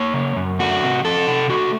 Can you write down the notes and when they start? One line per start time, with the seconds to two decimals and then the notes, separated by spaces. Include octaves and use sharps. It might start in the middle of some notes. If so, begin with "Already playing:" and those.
Already playing: A#3 C#5
0.14 C#3
0.36 F#2
0.59 A3 F#4
0.82 C3
1.05 F3 A4
1.27 C3
1.50 A3 F#4